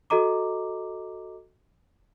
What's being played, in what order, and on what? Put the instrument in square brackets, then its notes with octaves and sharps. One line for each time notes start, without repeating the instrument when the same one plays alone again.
[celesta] F#4 A4 D#5 A#5 D6